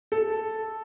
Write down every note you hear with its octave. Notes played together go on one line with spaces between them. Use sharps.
A4